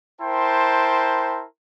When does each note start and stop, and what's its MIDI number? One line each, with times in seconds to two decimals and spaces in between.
0.21 1.44 64
0.21 1.44 70
0.21 1.44 72
0.21 1.44 79
0.21 1.44 81
0.21 1.44 84